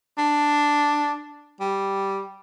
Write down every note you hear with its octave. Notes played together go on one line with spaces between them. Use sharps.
D4
G3